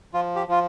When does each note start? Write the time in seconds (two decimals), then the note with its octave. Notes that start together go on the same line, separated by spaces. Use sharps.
0.14 F3 F4
0.36 G4
0.48 F3 F4